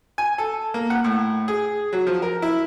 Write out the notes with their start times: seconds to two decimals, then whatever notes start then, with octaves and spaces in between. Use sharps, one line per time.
0.18 G#5
0.38 A4
0.74 A#3
0.90 F#5
1.04 A2
1.48 G#4
1.93 F#3
2.07 F3
2.22 A#4
2.42 E4